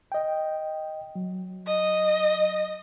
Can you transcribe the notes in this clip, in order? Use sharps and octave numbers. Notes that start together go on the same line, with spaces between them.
D#5 G5
F#3
D#5